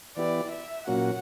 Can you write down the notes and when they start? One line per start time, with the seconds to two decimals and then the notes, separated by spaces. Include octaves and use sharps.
0.17 E3 B3 E4 G4 D5
0.51 E5
0.87 A#2 F#3 A#3 C#4 F#4 F#5